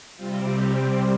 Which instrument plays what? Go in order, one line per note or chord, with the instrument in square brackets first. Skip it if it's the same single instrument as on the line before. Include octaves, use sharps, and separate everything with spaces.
[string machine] C3 G3 C4 F4
G4